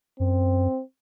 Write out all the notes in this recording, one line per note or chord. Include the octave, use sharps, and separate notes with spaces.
F#2 C4